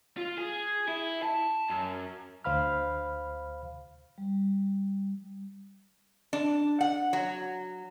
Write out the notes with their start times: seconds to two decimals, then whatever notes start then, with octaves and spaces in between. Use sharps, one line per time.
0.18 F4
0.39 G#4
0.88 E4
1.22 A5
1.70 F#2
2.44 D2 C5 F5 B5 F6
4.18 G3
6.33 D4
6.81 F#5
7.13 F#3